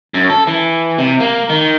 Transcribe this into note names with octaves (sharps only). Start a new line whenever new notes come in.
F#2
A4
E3
C3
A#3
D#3